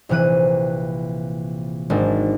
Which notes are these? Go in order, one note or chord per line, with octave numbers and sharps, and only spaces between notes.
A#1 C3 E3 F#6 D#7
G#1 G#3 D4